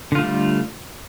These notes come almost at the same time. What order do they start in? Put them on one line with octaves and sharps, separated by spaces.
D3 F4 A3 G3